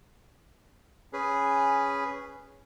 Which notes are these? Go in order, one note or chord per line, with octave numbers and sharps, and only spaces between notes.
C#4 G#4 B4